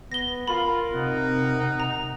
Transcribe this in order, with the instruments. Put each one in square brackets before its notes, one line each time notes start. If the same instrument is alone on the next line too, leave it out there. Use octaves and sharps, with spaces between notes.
[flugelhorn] B3 [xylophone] A#6 G7
[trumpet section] F4 [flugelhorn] A#4 [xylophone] B5
[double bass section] C3 [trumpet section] D#4 F#5
[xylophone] A#5